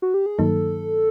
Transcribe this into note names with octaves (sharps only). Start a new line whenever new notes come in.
F#4
G4
G#4
G2 D#3 F#3 A#3 D#4 A4